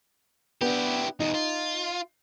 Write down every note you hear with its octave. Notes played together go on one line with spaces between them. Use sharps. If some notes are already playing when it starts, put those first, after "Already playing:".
B3 D4 E4 G4
E2 B2 D#4
F4